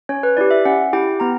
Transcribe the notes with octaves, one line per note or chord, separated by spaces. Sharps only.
C#4 C#5
B4
E4 G4 D5
E5
C#4 F#5
E4 G4 G5
B3 A#5